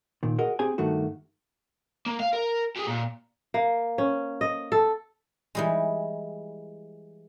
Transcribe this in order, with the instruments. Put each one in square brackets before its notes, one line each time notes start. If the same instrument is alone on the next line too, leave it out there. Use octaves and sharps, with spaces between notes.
[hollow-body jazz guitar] A#2 D#3
F#4 G#4 A#4 D#5
C4 G4 G#4 G#5
G2 D#3 A3 F#4
[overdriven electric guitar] A#3
F5
A#4
G4 G#4
A#2
[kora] A#3
C#4
D#5
A4
[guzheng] E3 G3 G#3